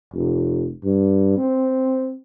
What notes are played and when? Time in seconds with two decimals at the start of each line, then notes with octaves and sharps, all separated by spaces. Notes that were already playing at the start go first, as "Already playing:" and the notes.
0.14 F1
0.84 G2
1.37 C4